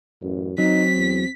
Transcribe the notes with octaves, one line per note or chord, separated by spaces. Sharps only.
A1 F#2
F#3 C4 D#4 B6
E2